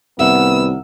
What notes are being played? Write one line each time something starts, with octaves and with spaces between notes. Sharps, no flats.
C2 D#3 B3 E5 F#5 E6